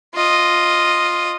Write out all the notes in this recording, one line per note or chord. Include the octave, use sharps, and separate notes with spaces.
F4 D#5